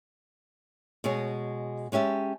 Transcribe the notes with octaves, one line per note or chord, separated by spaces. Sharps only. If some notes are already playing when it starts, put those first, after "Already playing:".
B2 G#3 G#4 C#5
G#3 C#4 G4 E5 A5